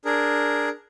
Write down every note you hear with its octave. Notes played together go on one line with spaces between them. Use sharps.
D4 G#4 A#4